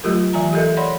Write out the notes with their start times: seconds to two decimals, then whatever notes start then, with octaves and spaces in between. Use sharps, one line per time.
0.04 F#3 A3 F4 G4 A#4
0.33 E3 E5 G#5 A#5
0.53 G4 A4 A#4 D#5 E5
0.77 C#5 D5 F#5 B5 C6